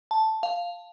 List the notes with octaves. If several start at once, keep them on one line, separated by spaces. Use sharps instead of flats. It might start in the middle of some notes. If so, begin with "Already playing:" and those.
A5
F5